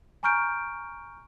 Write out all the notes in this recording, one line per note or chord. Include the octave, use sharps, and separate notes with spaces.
G#5 A#5 C#6 F6 G6 D7